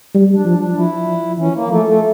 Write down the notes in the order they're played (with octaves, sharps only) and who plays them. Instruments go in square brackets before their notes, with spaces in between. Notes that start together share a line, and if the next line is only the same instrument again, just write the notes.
[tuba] G3
[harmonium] D4
[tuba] F3
[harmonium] D4
[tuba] F3 [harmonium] E4
[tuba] F3
[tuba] E3 [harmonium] C#4
[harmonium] A#3
[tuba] F3 [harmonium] A3
[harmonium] A3